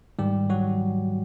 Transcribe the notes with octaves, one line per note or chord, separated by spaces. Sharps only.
G#2 D#3 G3 G4
F#3 F#4